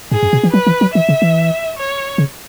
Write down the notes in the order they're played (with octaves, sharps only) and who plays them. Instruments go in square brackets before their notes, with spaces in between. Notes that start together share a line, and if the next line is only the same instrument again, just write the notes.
[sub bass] G#2 [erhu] G#4
[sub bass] F#2
B2
E3
[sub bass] F#3 [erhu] B4
[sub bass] E3
F#3
[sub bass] E3 [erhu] E5
[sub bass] C#3
E3
[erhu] C#5
[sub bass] C#3